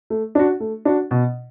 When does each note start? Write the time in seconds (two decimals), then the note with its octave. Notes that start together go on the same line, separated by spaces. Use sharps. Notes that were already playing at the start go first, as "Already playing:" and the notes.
0.10 A3
0.35 D4 F#4
0.60 A3
0.85 D4 F#4
1.11 B2